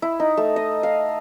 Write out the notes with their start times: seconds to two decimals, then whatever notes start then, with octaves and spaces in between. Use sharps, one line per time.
0.02 E4
0.20 D#4
0.37 A3
0.56 D#5
0.83 F5